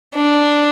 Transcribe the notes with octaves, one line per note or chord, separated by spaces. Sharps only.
D4